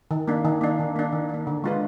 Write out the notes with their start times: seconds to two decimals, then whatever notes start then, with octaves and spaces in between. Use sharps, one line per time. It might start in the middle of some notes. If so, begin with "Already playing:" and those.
0.11 D#3
0.28 A#3 D4
0.45 D#3
0.61 A#3 D4
0.79 D#3
0.96 A#3 D4
1.12 D#3
1.29 A#3 D4
1.47 D3
1.64 G#3 D4 F4 B4